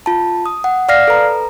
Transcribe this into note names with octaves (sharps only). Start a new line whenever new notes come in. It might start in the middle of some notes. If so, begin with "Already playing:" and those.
F4 A5
D#6
F#5
D5 F5 F6 A#6 C7
A4 B4 A#5